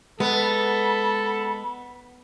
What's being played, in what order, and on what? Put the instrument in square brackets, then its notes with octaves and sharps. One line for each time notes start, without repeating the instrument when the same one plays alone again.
[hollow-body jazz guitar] G#3 [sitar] B3 [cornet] A4 [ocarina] B5